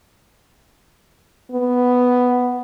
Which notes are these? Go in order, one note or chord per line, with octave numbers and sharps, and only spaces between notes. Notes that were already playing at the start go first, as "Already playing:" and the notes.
B3